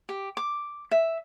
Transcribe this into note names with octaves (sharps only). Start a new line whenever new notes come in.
G4
D6
E5